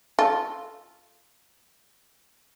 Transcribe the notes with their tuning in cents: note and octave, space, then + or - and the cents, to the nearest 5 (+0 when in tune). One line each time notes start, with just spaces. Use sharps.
F4 +0 A4 +0